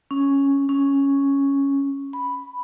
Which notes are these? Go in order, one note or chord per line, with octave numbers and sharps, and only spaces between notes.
C#4
C#4
B5